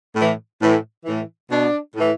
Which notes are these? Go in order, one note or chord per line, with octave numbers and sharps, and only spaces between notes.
A2 E3
A2 E3
A2 E3
B2 D4
A2 E3